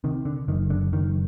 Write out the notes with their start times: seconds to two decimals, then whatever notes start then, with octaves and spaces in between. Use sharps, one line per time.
0.04 C3 D#3
0.25 D3
0.48 F#1 D#3
0.70 D3
0.93 F#1 D#3